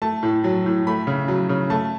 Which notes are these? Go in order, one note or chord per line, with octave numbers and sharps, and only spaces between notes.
A3 A5
A2
F#3
A2
A3 B5
C#3
F#3
C#3
A3 A5